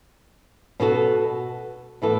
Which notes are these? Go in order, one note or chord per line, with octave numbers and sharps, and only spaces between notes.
B2 B3 F#4 A4
A2 E3 B3 F#4 A4